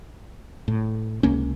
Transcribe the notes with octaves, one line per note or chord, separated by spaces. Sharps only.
A2
C#2 C3 A#3 C#4